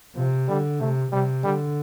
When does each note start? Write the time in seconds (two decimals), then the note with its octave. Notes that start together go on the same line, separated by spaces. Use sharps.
0.16 C3 F3
0.48 D3 G3
0.80 C3 A3
1.12 C3 G3
1.44 D3 G3